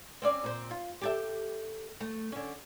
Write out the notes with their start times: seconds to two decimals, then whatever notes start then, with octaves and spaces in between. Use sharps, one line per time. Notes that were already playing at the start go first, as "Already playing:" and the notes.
0.22 C4 C#4 D5
0.44 A#2 C4
0.71 F4
1.01 G4 A4 E5
2.00 A3
2.32 D3 C#4